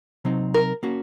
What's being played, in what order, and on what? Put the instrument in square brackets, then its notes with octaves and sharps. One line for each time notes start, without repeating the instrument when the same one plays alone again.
[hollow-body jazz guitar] C3 F#3 C4 D#4
[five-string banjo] A#4
[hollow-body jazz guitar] A#3 C#4 F#4